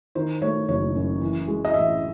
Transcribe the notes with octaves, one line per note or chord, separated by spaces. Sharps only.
D#3 C5
A3 C#5
F#1 C#5
F#2
E3
G#3
D#5
A1 E5